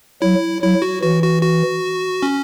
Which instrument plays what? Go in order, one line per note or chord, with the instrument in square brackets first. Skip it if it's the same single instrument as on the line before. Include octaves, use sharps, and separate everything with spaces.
[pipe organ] F#3 [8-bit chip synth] E4
[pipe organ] F#3 [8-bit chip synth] E4
[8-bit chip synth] F#4
[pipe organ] E3 [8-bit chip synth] F#4
[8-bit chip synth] F#4
F#4
C#4